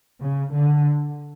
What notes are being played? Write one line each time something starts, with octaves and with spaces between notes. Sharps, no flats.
C#3
D3